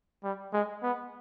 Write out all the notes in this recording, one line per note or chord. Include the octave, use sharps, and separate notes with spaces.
G3
G#3
B3